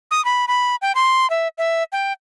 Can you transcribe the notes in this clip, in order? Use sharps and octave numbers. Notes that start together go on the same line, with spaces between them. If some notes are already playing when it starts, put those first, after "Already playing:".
D#6
B5
B5
G5
C6
E5
E5
G5